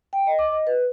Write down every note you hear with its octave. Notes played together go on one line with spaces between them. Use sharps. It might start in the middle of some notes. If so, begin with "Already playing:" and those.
G5
D#5
D6
D#5
B4